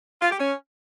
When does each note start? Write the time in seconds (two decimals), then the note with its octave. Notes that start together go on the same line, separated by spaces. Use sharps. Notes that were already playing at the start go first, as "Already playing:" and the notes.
0.21 F4
0.31 G4
0.40 C#4